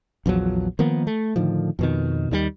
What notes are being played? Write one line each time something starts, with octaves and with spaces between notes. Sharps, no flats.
A#1 E2 F3 F#3
D#3 F3 A#3 B3
A3
A2 D3 D#3 F3
F2 B2 D#3
D#2 D#3 E3 G3